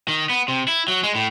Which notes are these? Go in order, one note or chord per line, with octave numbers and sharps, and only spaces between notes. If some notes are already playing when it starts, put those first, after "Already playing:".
D#3
B3
C3
E4
F#3
G#3
A2